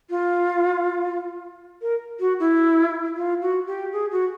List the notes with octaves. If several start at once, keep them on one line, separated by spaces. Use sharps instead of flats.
F4
A#4
F#4
E4
F4
F#4
G4
G#4
F#4